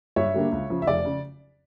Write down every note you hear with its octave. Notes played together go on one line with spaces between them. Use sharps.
G2 C#5 E5
D3 G3 A#3 D4
C#2
C#3 F3
E5
F1 D5
C#3